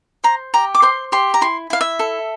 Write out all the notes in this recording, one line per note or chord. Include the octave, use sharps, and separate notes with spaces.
C5 A#5
G4 A#5
D6
C5 C6
G4 C6
A#5
E4 C6
E4 F5
E5
A4